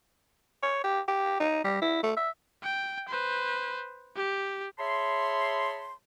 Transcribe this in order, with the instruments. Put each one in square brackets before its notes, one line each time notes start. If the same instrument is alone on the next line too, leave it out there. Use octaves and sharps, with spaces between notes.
[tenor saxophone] C#5
G4
G4
D#4
G3
E4
A3
E5
[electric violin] G5
B4 C5
G4
[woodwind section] G#4 C#5 E5 A5 B5 C6